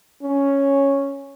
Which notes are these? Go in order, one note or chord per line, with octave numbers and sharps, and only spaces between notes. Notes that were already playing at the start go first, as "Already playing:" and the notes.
C#4